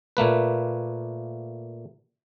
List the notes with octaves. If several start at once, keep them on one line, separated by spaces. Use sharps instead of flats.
A#2 A3 A#3 B4